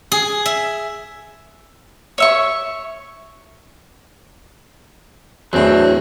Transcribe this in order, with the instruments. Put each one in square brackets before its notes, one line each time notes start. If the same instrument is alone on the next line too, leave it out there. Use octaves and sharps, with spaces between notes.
[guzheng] G#4
E5
[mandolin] C#5 E5 C#6
[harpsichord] E2 A2 [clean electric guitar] F#3 C4 D4